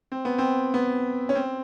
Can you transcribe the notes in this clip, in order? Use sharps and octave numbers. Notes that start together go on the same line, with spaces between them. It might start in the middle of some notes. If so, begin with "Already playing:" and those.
C4
B3
C4
B3
C#4
C4